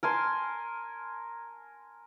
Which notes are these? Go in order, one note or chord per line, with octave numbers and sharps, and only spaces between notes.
A#4 G#5 A5 C6